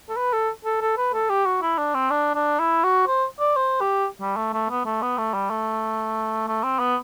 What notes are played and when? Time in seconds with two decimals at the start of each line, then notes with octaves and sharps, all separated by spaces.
0.09 A4
0.17 B4
0.33 A4
0.65 A4
0.81 A4
0.97 B4
1.14 A4
1.30 G4
1.46 F#4
1.62 E4
1.78 D4
1.94 C4
2.11 D4
2.35 D4
2.59 E4
2.84 F#4
3.08 C5
3.40 D5
3.56 C5
3.81 G4
4.21 G3
4.36 A3
4.53 A3
4.70 B3
4.86 A3
5.02 B3
5.18 A3
5.34 G3
5.50 A3
6.48 A3
6.63 C4
6.79 B3